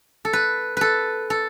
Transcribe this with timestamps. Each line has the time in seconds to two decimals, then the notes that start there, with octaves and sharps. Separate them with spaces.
0.25 A4
0.33 B4
0.77 A4 B4
1.30 A4